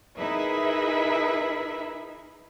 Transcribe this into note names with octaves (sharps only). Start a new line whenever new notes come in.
D#4 E4 G#4 A#4 B4 E5